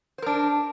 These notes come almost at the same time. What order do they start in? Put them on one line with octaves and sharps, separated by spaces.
C5 A#4 D4